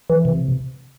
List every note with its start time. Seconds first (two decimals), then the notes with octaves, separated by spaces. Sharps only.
0.10 E3
0.25 C3